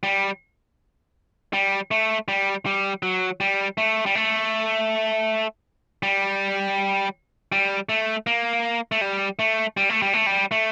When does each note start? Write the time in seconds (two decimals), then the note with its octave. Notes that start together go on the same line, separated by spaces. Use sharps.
0.03 G3
1.53 G3
1.91 A3
2.28 G3
2.66 G3
3.03 F#3
3.40 G3
3.78 A3
4.06 G3
4.15 A3
6.03 G3
7.52 G3
7.89 A3
8.27 A#3
8.92 A3
9.01 G3
9.39 A3
9.77 G3
9.89 A3
10.02 G3
10.13 A3
10.26 G3
10.51 A3